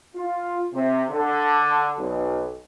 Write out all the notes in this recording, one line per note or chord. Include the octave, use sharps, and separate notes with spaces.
F4
C3
D3
B1